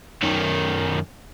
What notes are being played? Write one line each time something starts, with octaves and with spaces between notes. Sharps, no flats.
F#2 D#3